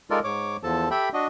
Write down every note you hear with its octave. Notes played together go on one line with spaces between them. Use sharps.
G#3 D#4 F4 A4 A#4 D5
G#2 C#5 D6
E2 F3 A4 A5
G4 A4 E5 G5 B5
D4 F#4 D#5